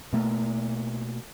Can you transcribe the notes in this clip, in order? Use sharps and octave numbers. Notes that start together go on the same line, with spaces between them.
B2 A3 A#3